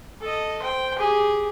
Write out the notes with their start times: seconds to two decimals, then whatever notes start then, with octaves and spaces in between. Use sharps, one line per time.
0.21 A4 D#5
0.62 C5 G5
0.98 G4 G#4